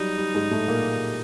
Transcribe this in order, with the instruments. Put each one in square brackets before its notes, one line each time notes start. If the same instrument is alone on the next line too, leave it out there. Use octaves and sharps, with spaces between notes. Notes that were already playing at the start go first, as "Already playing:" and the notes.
Already playing: [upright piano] F#3 G3 [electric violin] D#4
[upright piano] G3
G#2 G#3
A2 A3
A#2 A#3